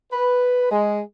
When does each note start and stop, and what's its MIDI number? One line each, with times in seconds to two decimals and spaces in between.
0.12 0.70 71
0.70 1.01 56